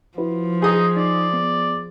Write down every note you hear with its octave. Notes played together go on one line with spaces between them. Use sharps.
F3 E4 F#4 B4
D#4 G#4 D#6
D#4 D5
B3